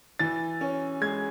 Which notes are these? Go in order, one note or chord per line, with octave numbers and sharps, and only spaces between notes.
E3 A6
C#4
G#3 G#6